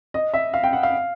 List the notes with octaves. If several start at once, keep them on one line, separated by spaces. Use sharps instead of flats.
D#5
E5
F5
G5
F#5
F5